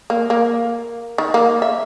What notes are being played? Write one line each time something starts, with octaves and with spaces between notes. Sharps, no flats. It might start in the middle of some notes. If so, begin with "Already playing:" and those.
A#3
A#3
D#3
A#3
E5